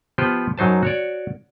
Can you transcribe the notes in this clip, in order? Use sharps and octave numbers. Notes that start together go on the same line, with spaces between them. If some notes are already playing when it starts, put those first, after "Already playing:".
F3 B3 G4 B4 C5
F#2 F#3 D#4 C5 A5
F#4 C#5 D5